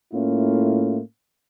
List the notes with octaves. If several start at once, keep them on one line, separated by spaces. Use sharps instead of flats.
A2 A3 A#3 C#4 E4 F4